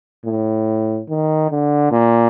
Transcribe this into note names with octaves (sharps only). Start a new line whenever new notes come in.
A2
D#3
D3
A#2